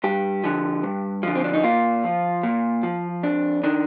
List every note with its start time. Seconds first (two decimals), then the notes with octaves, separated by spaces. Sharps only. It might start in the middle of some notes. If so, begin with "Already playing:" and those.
0.04 G2 G4
0.44 D3 F3
0.84 G2
1.23 D3 F3
1.36 C4
1.44 D4
1.53 D#4
1.64 A#2 F4
2.04 F3
2.43 A#2
2.83 F3
3.23 F2 D4
3.63 D#3 D4